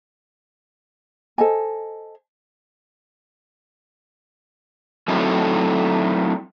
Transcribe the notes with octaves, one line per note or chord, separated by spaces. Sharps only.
A4 C5 D#5 G#5
F#3 A3 C4 D#4 E4 A4